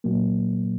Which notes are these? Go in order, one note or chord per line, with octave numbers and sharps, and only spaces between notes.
A#2 F#3 A#3